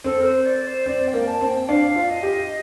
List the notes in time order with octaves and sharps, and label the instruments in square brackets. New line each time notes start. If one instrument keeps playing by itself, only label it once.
[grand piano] C4 [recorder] A4
[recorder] A#4
C5
D5
C5
[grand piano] C4 [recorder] D5
[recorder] G5
[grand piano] A#3
[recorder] A5
[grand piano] C4
[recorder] G5
[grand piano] D4 [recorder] F5
[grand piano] F4
[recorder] D#5
[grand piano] G4